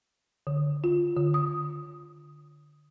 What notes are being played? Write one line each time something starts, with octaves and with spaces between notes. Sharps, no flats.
D3
F4
D3
D#6